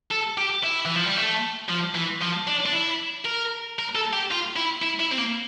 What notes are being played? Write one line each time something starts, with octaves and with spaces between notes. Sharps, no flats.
A4
G4
E4
E3
F3
G3
A3
F3
E3
F3
D4
D4
E4
A#4
A#4
A4
G4
F4
E4
E4
E4
C4
A#3